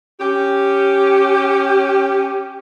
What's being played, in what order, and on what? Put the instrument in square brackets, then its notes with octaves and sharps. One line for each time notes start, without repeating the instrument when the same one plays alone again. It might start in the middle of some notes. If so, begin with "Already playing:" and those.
[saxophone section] C#4 G4